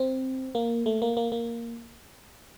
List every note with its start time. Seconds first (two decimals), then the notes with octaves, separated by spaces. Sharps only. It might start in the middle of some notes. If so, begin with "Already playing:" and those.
Already playing: C4
0.55 A#3
0.86 A3
1.02 A#3
1.17 A#3
1.32 A#3